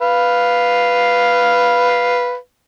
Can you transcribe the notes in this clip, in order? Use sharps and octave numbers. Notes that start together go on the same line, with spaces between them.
B4 F5